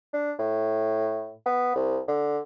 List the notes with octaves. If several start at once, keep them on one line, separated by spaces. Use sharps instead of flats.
D4
A2
B3
C2
D3